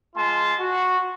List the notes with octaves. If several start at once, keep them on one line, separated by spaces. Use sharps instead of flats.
G#3 F4 A5 C6
F#4